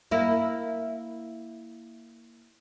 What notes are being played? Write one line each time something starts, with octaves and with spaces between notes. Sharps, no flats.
A#3 E4